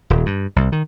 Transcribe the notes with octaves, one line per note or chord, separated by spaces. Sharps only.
D#1
G2
C2
D#3